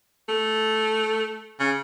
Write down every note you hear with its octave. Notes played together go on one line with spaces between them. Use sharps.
A3
C#3